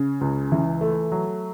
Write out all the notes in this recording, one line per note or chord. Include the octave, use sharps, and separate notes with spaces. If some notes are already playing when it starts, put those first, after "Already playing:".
Already playing: C#3
C#2
E3
A3
F#3